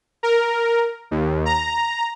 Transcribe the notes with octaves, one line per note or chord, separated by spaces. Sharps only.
A#4
D#2
A#5